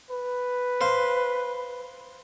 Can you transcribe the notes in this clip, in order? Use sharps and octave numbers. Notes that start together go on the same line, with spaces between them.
B4
C5 F5 C6